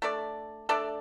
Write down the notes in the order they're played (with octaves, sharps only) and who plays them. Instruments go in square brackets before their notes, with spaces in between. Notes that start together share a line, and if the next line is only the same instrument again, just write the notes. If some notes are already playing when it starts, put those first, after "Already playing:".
[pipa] A3 D4 A4 D5
A3 D4 A4 D5